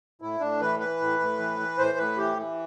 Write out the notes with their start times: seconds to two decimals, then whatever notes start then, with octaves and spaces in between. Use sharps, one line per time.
0.22 A2 E4
0.40 A2 D4
0.61 E3 B4
0.79 E3 B4
1.00 A2
1.20 A2
1.38 E3
1.59 E3
1.78 A2 C5
1.98 A2 B4
2.17 E3 G4
2.37 E3